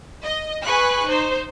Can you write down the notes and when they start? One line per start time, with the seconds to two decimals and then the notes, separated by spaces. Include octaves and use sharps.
0.24 D#5
0.64 G#4 B4 G#5 C#6 F#6
1.05 D#4 C5